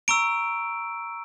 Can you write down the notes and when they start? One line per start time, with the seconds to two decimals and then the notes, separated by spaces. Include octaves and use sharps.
0.08 A#5 C#6 E6 D7